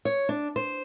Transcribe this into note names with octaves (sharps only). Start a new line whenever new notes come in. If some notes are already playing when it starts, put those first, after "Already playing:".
C#5
D4
C5